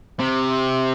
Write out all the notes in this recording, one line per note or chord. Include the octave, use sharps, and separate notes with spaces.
C3